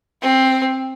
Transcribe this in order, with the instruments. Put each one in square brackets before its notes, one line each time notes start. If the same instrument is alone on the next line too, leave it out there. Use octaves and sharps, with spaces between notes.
[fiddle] C4